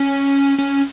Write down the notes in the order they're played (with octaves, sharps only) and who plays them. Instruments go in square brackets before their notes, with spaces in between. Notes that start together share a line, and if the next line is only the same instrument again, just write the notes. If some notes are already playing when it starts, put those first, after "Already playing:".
Already playing: [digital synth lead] C#4
C#4